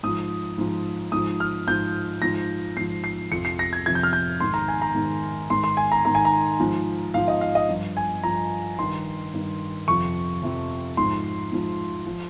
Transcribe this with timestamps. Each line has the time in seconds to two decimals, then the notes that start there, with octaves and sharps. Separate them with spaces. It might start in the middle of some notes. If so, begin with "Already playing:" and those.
0.03 G#2 F3 D#6
0.58 G#2 F3
1.12 G#2 F3 D#6
1.40 F6
1.67 G#2 F3 G6
2.22 G#2 F3 A#6
2.76 G#2 F3 C7
3.04 C7
3.32 F2 C3 F3 C#7
3.45 C7
3.59 A#6
3.73 G#6
3.86 F2 C3 F3 G#6
3.95 G6
4.03 F6
4.13 G6
4.40 G#2 D#3 C6
4.54 A#5
4.68 G#5
4.82 A#5
4.95 G#2 D#3
5.50 G#2 D#3 C6
5.64 C6
5.77 G#5
5.92 A#5
6.05 G#2 D#3 A#5
6.15 G#5
6.25 A#5
6.60 G#2 F3
7.14 G#2 F3 F5
7.28 D#5
7.41 F5
7.55 D#5
7.69 G2 F3
7.97 G#5
8.24 G2 F3 A#5
8.78 G2 D#3 C6
9.34 G2 D#3
9.88 F2 C3 F3 C#6
10.43 F2 C3 F3
10.97 G#2 F3 C6
11.52 G#2 F3
12.07 F3